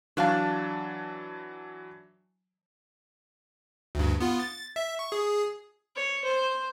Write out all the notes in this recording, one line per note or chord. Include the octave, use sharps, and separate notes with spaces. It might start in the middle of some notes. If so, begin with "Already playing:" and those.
E3 F#3 D4 F#4 F5 A5
D2 G2
B3 F4
A6
E5
C#6
G#4
C#5
C5